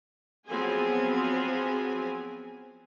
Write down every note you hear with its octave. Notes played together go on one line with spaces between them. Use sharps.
F3 F#3 B3 C4 G#4 G#5